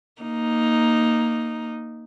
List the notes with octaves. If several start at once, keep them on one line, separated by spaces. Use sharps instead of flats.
A#3 D#4